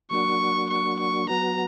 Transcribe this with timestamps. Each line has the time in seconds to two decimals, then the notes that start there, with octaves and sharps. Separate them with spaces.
0.11 F#3 A#3 D4 F#4 C#6
0.70 C#6
1.00 C#6
1.29 F#3 B3 F#4 A#5